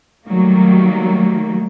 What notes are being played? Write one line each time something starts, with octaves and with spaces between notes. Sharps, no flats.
D#3 F#3 G3 A3 A#3